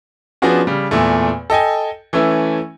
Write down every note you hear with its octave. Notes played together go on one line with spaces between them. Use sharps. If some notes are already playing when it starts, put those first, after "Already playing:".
F3 B3 C#4 D4 F#4 G#4
C#3 G3
E2 A#2 A3
A4 D#5 G5 G#5
E3 A3 C#4 E4